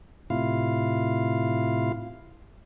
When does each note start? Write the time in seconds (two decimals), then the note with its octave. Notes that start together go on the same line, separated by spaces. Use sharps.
0.30 A2 C3 E4 F4 F5